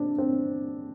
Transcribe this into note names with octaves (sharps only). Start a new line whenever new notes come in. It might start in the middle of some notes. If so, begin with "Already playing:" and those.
Already playing: C4 D4
C4